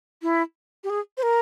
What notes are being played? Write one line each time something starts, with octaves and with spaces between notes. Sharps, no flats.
E4
G4
G#4
C5
A#4